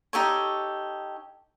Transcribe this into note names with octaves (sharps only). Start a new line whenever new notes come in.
D#4 G4 A4 C#5